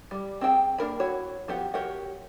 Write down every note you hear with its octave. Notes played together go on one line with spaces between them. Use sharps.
G3
C4 G#4 G5 A5
A#3 D4 A#4 B5
E4 F#4 C#5
F3 B3 G4 F#5
F#4 G4 A#4 C#5 F#5